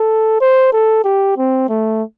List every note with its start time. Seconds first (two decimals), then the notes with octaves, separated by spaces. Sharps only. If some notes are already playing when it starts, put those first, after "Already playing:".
Already playing: A4
0.41 C5
0.73 A4
1.04 G4
1.37 C4
1.69 A3